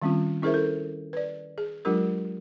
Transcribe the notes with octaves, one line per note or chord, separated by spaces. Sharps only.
D#3 G3 C4 C#4 F4
C#4 E4 G#4 A#4 C5 E5
A4
B4 D5
G#4
F#3 G#3 D4 F4 G4 A#4